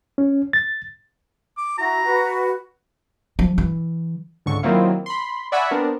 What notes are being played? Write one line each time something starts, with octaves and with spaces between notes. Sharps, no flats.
C#4
A6
D6
E4 F#4 A#5
F#4 B4 F#5
F3
E3
C#2 G#2 D3 C#6
D#3 F#3 A#3 C4 E4 F4
B5 C6
D5 E5 F#5 G#5 B5 C#6
B3 C4 D4 A#4